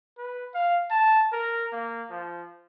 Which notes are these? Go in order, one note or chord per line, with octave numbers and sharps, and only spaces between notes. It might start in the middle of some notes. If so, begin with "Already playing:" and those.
B4
F5
A5
A#4
A#3
F3